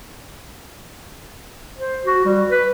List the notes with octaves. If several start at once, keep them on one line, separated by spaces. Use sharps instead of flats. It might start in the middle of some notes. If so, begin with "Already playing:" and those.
C5
F#4
G3
B4